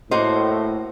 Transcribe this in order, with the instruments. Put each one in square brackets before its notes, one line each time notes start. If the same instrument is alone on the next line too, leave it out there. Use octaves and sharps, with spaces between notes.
[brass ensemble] A2 [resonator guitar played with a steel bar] A#3 F#4 C5 D#5